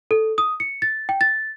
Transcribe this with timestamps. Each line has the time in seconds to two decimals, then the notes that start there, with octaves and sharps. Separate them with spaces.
0.11 A4
0.38 D#6
0.60 C#7
0.82 A6
1.09 G5
1.21 A6